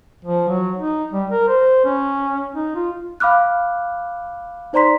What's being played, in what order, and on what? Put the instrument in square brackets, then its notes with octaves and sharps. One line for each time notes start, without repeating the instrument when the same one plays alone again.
[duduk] F3
F#3
D#4
G3
A#4
C5
C#4
D#4
F4
[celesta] F5 B5 D6 F6 F#6
D#4 C5 D5 A#5 C6 B6